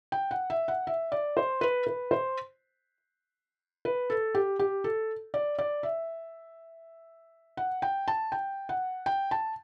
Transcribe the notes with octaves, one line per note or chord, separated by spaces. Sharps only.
G5
F#5
E5
F#5
E5
D5
C5
B4
B4
C5
B4
A4
G4
G4
A4
D5
D5
E5
F#5
G5
A5
G5
F#5
G5
A5